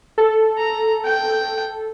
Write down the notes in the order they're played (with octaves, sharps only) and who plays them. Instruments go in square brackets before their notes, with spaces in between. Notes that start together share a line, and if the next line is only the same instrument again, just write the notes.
[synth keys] A4
[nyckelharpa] A#5
G5